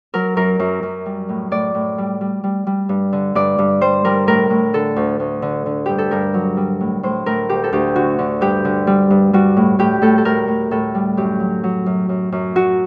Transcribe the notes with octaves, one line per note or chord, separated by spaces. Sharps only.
F#3 A#4
F#2 A#4
F#2
F#2
G3
A2
A2 D5
A2
G3
G3
G3
G3
G2
D3
G2 D5
G2
G3 C5
G3 A#4
A2 A#4
A2
D3 A4
D2
D2
D3
D3
G2 G4
A4
G2 A#4
F#3
G3
A2
A2 C5
A2 A#4
D2 G4
A4
D2 G4
D3 F#4
D3
G2 G4
D3
G3
G2
G3 F#4
A2
A2 G4
A2 A4
A4
A2 A#4
A2
A2 A4
G3
F#2 G4
F#3
F#3
F#2
F#2
F#2
F#3 F#4